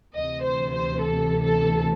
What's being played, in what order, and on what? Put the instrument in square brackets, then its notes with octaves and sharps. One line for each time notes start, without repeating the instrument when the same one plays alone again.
[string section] D2 C3 E3 D#5
C5
C5
A4
A4